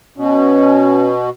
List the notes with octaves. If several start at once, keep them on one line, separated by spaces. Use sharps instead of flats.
B2 C#4